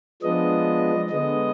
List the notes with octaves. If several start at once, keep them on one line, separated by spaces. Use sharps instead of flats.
F3 G#3 B3 D4 D#5
D3 G#3 B3 D#5